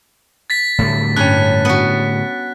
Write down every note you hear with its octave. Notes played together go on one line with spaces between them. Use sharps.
A6 B6
A2 D3 G3
G2 C#4 F#6
B3 F#4